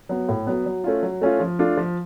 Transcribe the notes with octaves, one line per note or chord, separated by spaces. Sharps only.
F#3 B3
A2
F#3 B3
F#3
A3 C#4 F4
F#3
A3 C#4 F4
F3
A3 D4 F4
F3